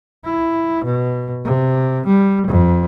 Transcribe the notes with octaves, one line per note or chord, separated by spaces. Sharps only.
E4
B2
C3
G3
F2